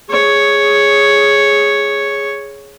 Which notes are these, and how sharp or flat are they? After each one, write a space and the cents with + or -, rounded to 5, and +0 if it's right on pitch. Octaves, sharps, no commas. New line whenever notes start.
G#4 +0 C#5 +0